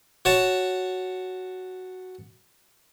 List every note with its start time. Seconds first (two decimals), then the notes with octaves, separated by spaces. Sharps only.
0.25 F#4 C#5 A5